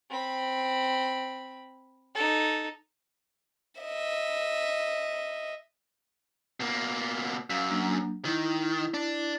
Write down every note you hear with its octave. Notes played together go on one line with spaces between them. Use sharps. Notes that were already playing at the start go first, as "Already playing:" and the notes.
C4 B5
D#4 A4
D#5 E5
B2 A#3
F#2 F5
F#3 A#3 D4
D#3 E4
D4